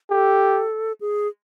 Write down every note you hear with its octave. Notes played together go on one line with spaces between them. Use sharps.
G4 A4
G#4